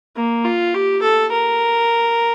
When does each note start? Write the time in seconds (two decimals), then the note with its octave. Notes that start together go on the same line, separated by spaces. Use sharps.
0.16 A#3
0.45 F4
0.74 G4
1.02 A4
1.32 A#4